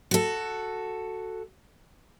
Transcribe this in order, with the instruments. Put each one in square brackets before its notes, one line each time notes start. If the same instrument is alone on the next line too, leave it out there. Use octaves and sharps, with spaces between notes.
[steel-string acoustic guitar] F#4 A4